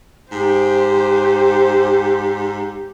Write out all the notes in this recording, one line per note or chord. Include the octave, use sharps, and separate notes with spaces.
G#2 G4 C5